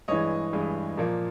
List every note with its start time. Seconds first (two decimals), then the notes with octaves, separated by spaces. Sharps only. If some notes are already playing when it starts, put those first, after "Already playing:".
0.08 G2 E3 G#3 C#5 D#5
0.53 G2 E3 G#3
0.97 A#2 F3 A#3